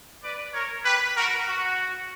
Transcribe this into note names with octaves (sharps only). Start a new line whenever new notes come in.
B4 D5
A#4 C#5
G4 B4
F#4 A#4
F#4